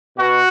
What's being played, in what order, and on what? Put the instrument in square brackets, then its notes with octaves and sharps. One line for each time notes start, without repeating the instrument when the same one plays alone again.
[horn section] B2 F#4